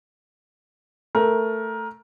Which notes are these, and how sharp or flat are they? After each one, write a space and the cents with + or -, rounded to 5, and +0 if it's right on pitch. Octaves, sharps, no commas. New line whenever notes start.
A3 +10 A#4 +15